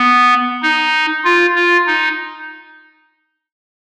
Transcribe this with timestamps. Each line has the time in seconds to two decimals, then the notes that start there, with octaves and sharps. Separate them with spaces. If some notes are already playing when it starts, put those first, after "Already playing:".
Already playing: B3
0.63 D#4
1.24 F4
1.55 F4
1.87 D#4